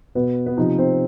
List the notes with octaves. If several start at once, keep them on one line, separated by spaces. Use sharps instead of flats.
B2 B3 B4
B3 B4
C3 F3 D#4 D#5
C4 C5